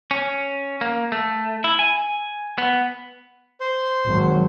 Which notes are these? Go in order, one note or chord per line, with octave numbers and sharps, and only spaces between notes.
C#4
A#3
A3
E4
G#5
B3
C5 C6
G#1 F#3